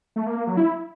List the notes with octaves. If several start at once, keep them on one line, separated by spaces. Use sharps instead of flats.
A3
A#3
A#3
F#3
E4